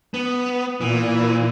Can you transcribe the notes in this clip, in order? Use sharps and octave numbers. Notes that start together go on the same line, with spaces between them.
B3
A#2 E3